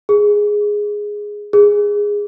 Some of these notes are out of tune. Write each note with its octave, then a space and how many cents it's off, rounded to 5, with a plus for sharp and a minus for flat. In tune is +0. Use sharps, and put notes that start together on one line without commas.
G#4 +0
G#4 -15